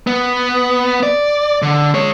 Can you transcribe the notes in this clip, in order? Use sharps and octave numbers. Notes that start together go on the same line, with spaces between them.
B3
D5
D3
G#3 C#5